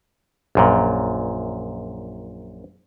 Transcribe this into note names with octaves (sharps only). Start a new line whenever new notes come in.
A#1 F#2 A#2